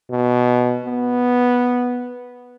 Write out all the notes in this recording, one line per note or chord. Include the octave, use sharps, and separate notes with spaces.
B2
B3